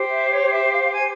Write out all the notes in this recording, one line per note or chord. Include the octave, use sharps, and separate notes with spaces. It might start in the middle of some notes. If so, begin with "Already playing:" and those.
Already playing: G4 C5
E5
C#5
E5
F5
F5
G#5